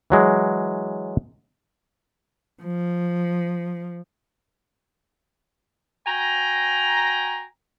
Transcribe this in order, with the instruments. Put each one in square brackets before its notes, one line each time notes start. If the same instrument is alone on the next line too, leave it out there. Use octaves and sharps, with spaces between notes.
[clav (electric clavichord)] E3 F#3 G#3
[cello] F3
[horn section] F#4 G5 G#5 A#5